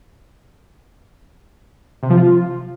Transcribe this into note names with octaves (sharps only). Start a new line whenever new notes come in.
C3
F3
F4